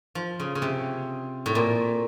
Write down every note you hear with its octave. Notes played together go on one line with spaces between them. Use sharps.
F3
C#3
C#3
C3
A2
A#2